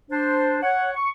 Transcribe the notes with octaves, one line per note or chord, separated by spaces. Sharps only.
D4 C5
C#5 F#5
C#6